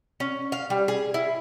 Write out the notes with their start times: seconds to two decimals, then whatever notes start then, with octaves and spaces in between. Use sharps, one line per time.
0.20 C#4
0.52 F5
0.70 G3
0.88 G#4
1.14 E4